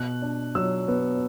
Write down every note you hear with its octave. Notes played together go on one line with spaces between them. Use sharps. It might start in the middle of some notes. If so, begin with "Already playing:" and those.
Already playing: B2 F#6
D4
F#3 E6
B3